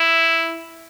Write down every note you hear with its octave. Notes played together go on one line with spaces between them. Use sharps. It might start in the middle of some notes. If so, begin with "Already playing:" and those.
Already playing: E4